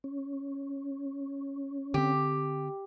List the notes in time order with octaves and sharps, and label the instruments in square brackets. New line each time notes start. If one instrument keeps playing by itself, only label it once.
[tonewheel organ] C#4
[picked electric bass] D3 C4 [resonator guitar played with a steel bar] G4